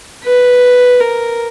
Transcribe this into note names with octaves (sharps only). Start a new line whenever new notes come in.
B4
A#4